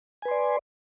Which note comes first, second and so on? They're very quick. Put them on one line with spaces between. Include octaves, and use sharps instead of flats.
G#5 B4 C6 D5